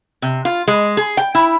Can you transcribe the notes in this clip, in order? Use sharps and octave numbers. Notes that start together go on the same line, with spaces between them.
C3
F4
G#3
G#4
G5
E4